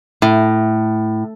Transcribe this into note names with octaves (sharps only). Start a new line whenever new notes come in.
A2